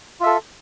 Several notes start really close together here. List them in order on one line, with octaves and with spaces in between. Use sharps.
F4 E5 A4